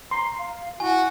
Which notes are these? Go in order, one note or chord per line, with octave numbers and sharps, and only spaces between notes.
A#5 C6
F5
E4 F#4 G#5